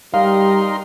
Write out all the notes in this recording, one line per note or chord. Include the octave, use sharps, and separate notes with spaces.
G3 D#4 A#4 F5 C6